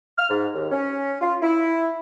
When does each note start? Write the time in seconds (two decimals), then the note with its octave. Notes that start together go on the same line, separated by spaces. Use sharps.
0.18 F6
0.30 G#2
0.54 D#2
0.72 C#4
1.21 F4
1.42 E4